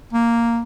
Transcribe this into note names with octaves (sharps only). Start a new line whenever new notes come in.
A#3